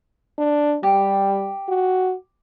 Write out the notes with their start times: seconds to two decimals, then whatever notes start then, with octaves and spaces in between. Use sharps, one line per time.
0.38 D4
0.83 G3 G4
1.68 F#4